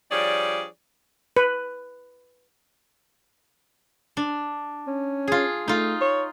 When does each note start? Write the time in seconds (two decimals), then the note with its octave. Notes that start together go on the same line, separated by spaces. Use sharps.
0.12 F3 G3 D4 G#4 C#5 D5
1.37 B4
4.17 D4
4.87 C#4
5.28 F4 G#4
5.68 A3 D#4 F4
6.01 C#5